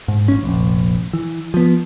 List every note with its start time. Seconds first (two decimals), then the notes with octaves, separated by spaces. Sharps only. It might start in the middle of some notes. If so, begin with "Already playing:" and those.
0.08 G#2
0.28 A1 C#4
0.44 F1 A#1
1.13 E3
1.54 F3 B3